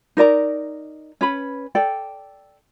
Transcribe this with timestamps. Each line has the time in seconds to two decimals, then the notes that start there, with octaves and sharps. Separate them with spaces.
0.17 D#4 A#4 D5 A#5
1.21 C#4 B4 B5
1.75 A4 D5 G5